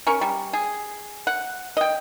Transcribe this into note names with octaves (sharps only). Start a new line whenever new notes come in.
C#4 A#4 C#6
G3
G#4
F#5
D#5 G5